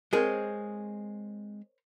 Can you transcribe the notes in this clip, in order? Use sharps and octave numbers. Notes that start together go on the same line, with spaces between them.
G#3 C4 G#4 A#4 C5 C#5